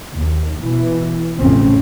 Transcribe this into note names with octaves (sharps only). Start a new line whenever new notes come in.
D#2
B2 E3
A1 F2 C#3 A3 C4 C#4